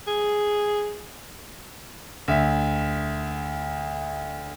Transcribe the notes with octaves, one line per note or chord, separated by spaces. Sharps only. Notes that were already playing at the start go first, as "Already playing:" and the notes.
G#4
D2 E5